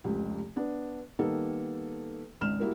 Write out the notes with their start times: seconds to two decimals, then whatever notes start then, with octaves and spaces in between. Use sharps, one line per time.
0.04 F1 C#2 F3 G4
0.56 B3 D4
1.19 D#3 G3 A#3 B3 D#4 A4
2.41 G#1 C#2 F6 E7
2.60 G3 A#3 E4 F#4 A#4